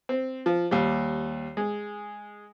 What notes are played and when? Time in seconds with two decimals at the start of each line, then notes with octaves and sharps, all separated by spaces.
0.09 C4
0.46 F3
0.71 D#2 G3
1.57 G#3